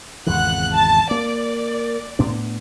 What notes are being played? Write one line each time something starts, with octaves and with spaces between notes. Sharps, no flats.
G#1 E2 C#3 F#5 F#6
A5
A#3 D5
A2 B3 D4